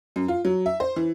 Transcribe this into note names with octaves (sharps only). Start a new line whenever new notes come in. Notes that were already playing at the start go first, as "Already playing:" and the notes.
F#2
F4
F#3
E5
C5
E3